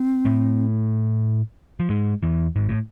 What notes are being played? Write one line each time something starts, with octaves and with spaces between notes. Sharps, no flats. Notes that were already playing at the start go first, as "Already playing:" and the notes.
Already playing: C4
A2 A3
F3
G#2 G#3
E2 E3
G#1 G#2
A2